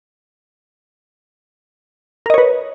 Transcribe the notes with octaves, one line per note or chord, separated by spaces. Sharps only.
A#4 B4 C#5 D#5